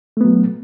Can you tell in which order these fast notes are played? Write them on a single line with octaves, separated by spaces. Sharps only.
A3 B3 F#3